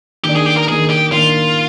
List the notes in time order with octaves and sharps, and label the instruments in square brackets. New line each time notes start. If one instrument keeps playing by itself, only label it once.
[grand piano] D#3 A#3 D4 [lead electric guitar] G4
[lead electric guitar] G#4
G4
A#4
[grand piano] D#3 A#3 D4 [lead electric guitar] G#4
[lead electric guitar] G4
[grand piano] D#3 A#3 D4 [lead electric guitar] F4